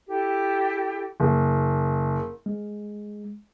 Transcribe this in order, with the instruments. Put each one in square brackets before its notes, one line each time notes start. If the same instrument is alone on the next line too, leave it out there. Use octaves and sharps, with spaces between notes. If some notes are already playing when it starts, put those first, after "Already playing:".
[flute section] E4 G4 A4
[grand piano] F#1
[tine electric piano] G#3